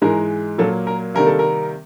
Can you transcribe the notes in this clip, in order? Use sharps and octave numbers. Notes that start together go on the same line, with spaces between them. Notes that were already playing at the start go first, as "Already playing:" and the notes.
G#2 E3 G#3 A#4
A#2 F#3 A#3 A4
A#4
C3 D#3 G3 A#3 A#4
A4
A#4